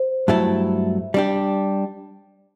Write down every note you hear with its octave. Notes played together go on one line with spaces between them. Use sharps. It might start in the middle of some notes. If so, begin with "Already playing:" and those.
Already playing: C5
G2 F#3 A3 E4 A4
G3 D4 G4